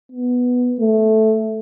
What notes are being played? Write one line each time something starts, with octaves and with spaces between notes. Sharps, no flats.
B3
A3